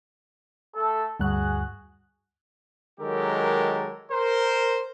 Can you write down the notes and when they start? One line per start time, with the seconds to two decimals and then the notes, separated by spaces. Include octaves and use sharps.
0.76 A3 A4
1.20 D2 G2 F#4 G#4 F#6
3.00 D#3 F#3 G#3 G4 A4 A#4
4.12 A#4 C5